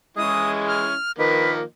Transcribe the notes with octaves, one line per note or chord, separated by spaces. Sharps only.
E3 G#3 C#4 E4 D#6
F6
D#3 F3 A#3 B4